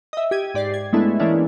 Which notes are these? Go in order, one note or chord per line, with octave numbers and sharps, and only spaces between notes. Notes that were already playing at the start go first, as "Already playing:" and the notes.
D#5 E5
G4 G#6 D#7
G#2 G4 D5 A6 C7
G#6
G#3 A3 B3 D4 E4 A4
E3 G#3 A#3 C#4 D4 E4